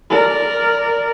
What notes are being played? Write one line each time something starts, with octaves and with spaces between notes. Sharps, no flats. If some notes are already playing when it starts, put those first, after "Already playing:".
A#4 D5